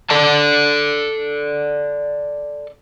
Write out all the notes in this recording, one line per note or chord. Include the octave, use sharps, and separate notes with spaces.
A4 D5 A5